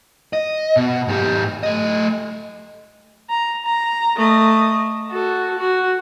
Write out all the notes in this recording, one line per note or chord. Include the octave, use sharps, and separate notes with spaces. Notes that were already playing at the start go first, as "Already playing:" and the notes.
D#5
B2
G#2 G4
A3 D#5
A#5
A#5
A3 D#5
F#4 A4
F#4